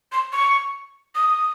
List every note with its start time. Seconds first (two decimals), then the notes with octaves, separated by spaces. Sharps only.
0.12 C6
0.33 C#6
1.15 D#6